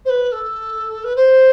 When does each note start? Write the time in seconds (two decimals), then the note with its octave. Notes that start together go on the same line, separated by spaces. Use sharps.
0.05 C5
0.09 B4
0.32 A4
1.04 B4
1.16 C5